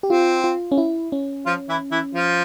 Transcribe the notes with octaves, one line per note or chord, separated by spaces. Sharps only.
G4
C4 F4
F4
C#4
E4
C#4
F3 F4
E3 E4
E3 E4
F3 F4